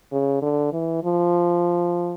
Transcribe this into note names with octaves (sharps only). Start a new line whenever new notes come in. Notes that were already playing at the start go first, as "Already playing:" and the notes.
C#3
D3
E3
F3